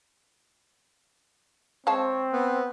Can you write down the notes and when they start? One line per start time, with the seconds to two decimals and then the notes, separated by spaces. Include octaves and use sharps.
1.87 G#3 C4 C#5 F5 A5
2.33 B3